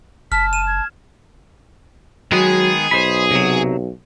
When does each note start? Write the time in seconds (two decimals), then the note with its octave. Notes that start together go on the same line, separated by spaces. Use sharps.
0.32 F#1 A5 F6 B6
0.53 D#7 E7
0.67 G#6
2.32 D#3 F#3 G#3 B3 G#4
2.91 B1 C5 D#5 B5
3.31 C3 F#3